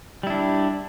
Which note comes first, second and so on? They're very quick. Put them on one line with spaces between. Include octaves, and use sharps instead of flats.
G3 E4 D4